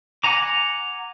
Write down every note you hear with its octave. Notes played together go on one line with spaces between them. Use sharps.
F#5 G#5 A#5 D6